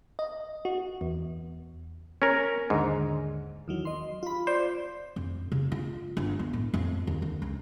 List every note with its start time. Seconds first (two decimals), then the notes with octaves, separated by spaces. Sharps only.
0.19 D#5
0.65 F#4
1.01 E2
2.22 C#4 A#4
2.70 D#2 G#2 D3
3.68 E2 D#3 F#3
3.85 D#5 C6
4.23 F4 B5
4.47 C5 D5
5.16 F2
5.52 C#3
5.72 F4
6.17 G1
6.39 B3
6.53 A2
6.74 F2
7.07 D#2
7.22 D2
7.42 C#2